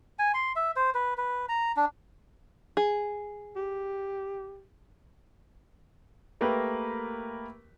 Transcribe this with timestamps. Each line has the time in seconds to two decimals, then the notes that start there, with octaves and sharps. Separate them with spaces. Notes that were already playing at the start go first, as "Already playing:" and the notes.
0.19 G#5
0.34 C6
0.56 E5
0.76 C5
0.94 B4
1.17 B4
1.49 A#5
1.76 D4
2.77 G#4
3.56 G4
6.41 A3 A#3 G4 A#4 B4